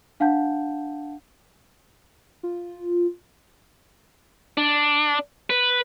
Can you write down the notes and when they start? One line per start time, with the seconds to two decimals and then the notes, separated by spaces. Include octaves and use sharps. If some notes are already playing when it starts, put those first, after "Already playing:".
0.20 D4 F5 F#5 A5 G6
2.43 F4
4.57 D4
5.50 B4